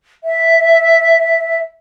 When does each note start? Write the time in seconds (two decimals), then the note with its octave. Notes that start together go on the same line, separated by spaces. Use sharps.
0.24 E5